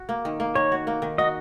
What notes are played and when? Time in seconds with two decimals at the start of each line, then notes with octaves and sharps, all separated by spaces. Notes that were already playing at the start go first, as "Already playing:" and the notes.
Already playing: F#4
0.09 A#3
0.25 D#3
0.40 A#3
0.55 D#3 C#5
0.72 F#4
0.87 A#3
1.02 D#3
1.18 F#4 D#5